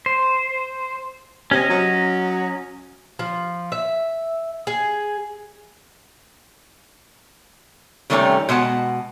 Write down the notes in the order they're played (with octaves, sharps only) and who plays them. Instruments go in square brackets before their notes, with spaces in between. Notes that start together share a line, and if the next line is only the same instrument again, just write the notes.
[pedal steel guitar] C5
[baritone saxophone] C3 [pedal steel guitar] C#4 D#5
[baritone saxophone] F#3
[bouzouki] F3
E5
G#4
[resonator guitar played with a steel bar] C3 D#3 G3 A3 B3 C#4
B2 G#3 F#5 A5